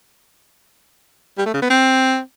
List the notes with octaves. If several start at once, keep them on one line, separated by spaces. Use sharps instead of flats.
G3
A3
C#3
B3
C4